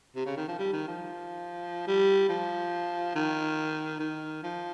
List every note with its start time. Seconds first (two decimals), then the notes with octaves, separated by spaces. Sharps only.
0.16 C3
0.26 C#3
0.37 D#3
0.48 F3
0.59 G3
0.73 D#3
0.88 F3
1.87 G3
2.29 F3
3.15 D#3
4.00 D#3
4.43 F3